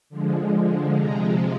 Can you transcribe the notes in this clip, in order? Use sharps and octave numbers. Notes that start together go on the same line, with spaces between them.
D3 F3 G#3
C3 F3 G#3 A#5